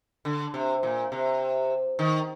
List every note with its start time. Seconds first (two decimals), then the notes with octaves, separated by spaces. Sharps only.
0.25 D3
0.54 C3
0.83 A#2
1.12 C3
1.99 D#3